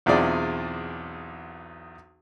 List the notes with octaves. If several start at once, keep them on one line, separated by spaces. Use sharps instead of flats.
B1 E2 C4 F4 G#4 D5